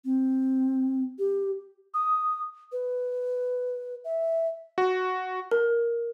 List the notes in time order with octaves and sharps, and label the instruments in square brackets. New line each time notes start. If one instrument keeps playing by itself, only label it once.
[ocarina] C4
G4
D#6
B4
E5
[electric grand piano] F#4
[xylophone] A#4